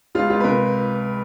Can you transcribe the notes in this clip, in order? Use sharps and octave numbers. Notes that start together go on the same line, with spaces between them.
C#2 F4
C#2 F4
B4
C3 A#4